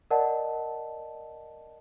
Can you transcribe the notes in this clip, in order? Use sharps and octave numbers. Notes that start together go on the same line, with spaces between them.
A#4 D5 D#5 F#5 A5